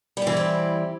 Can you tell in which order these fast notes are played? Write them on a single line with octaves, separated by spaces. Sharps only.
G3 G4 E3 E4 C4